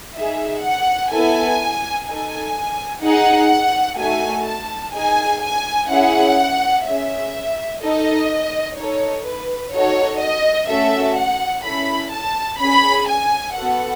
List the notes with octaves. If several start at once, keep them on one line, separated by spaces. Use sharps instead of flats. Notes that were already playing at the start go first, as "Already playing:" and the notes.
D#4 G#4 E5
F#5
B3 E4 A4 G#5
D#4 A4 G#5
D#4 G#4 F#5
A3 D#4 F#4 A4 G#5
A5
D#4 G#4 G#5
G#5
C#4 E4 G#4 F#5
C#4 G#4 E5
D#4 A4 D#5
D#4 A4 C#5
B4
D#4 F#4 A4 C#5
D#5
A3 C#4 F#4 A4 E5
F#5
C#4 E4 A4 B5
A5
C#4 G#4 B5
G#5
B3 F#4 A4 F#5